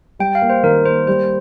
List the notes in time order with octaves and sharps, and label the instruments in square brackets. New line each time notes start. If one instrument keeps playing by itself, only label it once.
[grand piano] G3 [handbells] G5
[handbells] F5
[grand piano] A#3
[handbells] C5
[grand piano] D#3 [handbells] A#4
[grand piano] A#3 [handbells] C5
[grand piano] G3 [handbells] C5